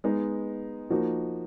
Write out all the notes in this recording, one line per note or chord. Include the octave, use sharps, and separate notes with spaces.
G#3 B3 D#4
F3 A#3 D#4 F#4